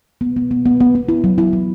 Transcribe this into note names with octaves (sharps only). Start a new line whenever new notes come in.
B3
B3
B3
B3
B3
B3
E4
F#3
E4
F#3